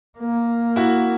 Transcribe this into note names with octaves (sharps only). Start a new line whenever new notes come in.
A#3
E4 F#4